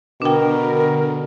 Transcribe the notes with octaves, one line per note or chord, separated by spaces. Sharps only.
B2 D3 D4 A#4 G5